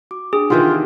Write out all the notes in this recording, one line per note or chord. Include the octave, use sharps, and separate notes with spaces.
F#4 D6
D4 G#4 G5
C3 D#3 E3 D#4 F4 G4 F#5